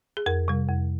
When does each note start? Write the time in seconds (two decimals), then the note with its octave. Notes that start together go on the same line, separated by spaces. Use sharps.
0.17 G#4
0.26 F2 A#4
0.48 C3 G3
0.68 F2